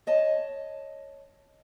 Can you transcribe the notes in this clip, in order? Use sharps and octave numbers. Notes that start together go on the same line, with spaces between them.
C#5 D#5 A5